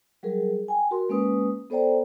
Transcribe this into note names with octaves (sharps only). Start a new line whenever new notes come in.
F#3 G3 G#4 A#4
G5 G#5
F#4 A#4 C6
G#3 A#3 C#4 B4 D#6
B3 A4 C5 D5 G5 A#5